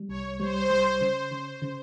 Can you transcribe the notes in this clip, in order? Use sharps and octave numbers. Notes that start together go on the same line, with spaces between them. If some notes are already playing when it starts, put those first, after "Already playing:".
Already playing: G3
C2 C#5
G3 C5
G3
C#3
C#3
C#3